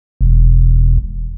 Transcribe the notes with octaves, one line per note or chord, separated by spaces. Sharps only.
E1